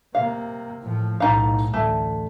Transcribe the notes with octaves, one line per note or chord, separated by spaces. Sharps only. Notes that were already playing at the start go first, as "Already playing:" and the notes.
C3 A#3 F5
A2 F3
B1 A2 D#4 F5
A1 D2 A3